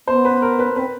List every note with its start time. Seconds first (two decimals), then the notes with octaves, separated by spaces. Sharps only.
0.07 B3 C5
0.25 B4
0.42 A#4
0.59 B4
0.76 C4 B4